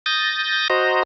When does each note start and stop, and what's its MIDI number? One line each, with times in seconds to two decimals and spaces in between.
0.06 0.68 87
0.06 0.68 91
0.06 0.68 93
0.06 0.68 94
0.70 1.03 66
0.70 1.03 72
0.70 1.03 75
0.70 1.03 82